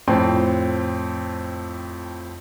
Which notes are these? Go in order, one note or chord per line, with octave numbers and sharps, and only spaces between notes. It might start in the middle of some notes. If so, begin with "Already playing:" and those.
F2 A2 C4